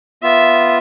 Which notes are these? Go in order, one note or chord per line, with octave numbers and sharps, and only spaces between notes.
B3 F4 E5